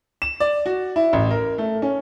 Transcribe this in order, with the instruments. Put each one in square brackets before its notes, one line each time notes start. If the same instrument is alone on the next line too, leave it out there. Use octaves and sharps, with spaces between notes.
[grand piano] E7
D5
F#4
E4
A1
A#4
A3
C#4